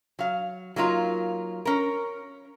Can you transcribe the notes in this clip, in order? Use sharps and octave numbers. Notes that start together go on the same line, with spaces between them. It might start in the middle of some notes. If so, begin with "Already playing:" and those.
F#3 F5
F#3 A#3 D#4 F4
C#4 A#4